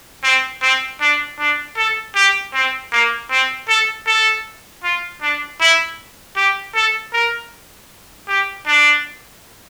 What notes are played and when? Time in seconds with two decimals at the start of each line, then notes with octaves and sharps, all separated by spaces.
0.24 C4
0.62 C4
1.01 D4
1.39 D4
1.77 A4
2.15 G4
2.54 C4
2.92 A#3
3.30 C4
3.69 A4
4.07 A4
4.83 F4
5.22 D4
5.60 E4
6.36 G4
6.75 A4
7.13 A#4
8.28 G4
8.67 D4